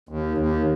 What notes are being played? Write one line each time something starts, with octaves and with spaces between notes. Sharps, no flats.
D#2
D#2